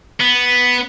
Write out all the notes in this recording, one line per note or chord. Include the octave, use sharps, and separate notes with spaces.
B3